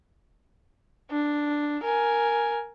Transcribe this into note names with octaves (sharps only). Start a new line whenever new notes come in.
D4
A#4 G#5